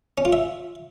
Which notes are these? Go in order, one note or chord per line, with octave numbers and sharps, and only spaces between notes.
C#4
F4
E5